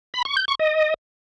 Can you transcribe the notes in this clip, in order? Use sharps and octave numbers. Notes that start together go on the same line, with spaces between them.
B5
C#6
G6
C#6
D#5